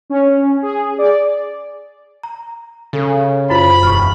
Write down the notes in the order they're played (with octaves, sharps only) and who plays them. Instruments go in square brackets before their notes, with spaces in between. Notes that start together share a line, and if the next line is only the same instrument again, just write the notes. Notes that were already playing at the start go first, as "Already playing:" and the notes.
[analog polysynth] C#4
G#4
D5
[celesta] A#5
[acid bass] C#3 [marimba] A4
[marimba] F#2 [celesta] E4 F4 C5 [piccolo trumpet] B5
[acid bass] E1 [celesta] C#6 F6